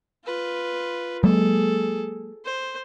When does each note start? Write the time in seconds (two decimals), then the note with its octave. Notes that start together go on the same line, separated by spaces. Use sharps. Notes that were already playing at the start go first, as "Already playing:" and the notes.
0.25 F4 B4
1.24 F#3 G#3 A#3 G#4 A4
2.45 C5